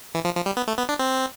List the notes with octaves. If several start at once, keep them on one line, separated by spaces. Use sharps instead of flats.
E3
F3
F3
G3
B3
A3
B3
D4
C4